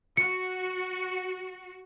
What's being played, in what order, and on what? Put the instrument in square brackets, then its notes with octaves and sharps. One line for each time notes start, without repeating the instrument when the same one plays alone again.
[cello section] F#4 [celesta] C#7